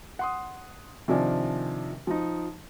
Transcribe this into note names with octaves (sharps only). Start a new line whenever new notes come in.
F#5 C6 D#6
C3 D#3 F3 D4 D5 G#5
F3 D#4